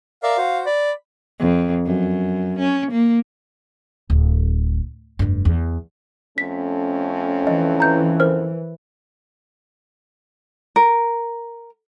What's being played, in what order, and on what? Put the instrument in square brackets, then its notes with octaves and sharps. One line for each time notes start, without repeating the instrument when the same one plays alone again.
[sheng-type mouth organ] A#4 D5 E5 [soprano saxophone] F5
[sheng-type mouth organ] F#4 C5
[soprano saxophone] D5 [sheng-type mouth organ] B5
[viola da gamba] F2
F#2
C#4
A#3
[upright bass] D1
F1 G2
E2
[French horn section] F2 A3 C#4 [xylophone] B6
[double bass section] E3 [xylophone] D#5
[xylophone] A#5 G6
A#4 C5 F6
[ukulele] A#4